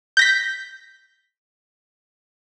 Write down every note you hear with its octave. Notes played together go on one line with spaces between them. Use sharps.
G6 A#6 B6